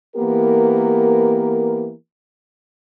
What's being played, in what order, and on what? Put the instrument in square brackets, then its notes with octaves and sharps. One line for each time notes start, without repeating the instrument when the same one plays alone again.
[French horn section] E3 A#3 B3 G4 A#4